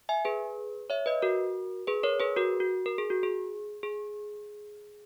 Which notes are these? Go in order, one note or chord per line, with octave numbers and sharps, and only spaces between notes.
E5 G#5
G#4 B4
C#5 E5
B4 D#5
F#4 A#4
G#4 B4
A#4 C#5
G#4 B4
F#4 A#4
F#4
A#4
G#4
F#4
G#4
G#4